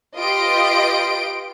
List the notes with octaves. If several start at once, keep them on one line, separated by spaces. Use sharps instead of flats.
F4 G4 B4 D#5 C6 D7